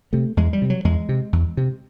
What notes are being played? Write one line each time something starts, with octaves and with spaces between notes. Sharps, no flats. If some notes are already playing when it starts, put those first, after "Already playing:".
C3 A3
E2 G#3
G3
C3
F#3
E2 G#3
C3
E2
C3